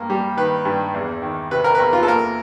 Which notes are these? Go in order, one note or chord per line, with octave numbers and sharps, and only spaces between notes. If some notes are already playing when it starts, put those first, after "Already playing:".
Already playing: G2 A#3
G3
D#3 B4
G2
E2
D#3
C3 B4
A#4
B4
E2 A#4
F4
A4
A#3 A#4